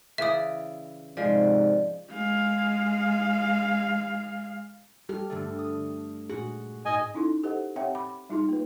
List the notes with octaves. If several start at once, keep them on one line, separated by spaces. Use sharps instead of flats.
C#3 E3 D5 E5 D#6
G#2 C3 F3 G#3 D5
G#3 F5
G3 G4 A4 F6
G2 D3 A3
D#6
A#2 F#4 G#4
G#2 D#5 G#5
C#4 D#4 E4 A4 C6
G4 A4 C5 D#5 F#5
C4 G4 C#5 E5 F#5 G5
B5 D6
G3 D#4 F4 G#4 C6
A#3 B4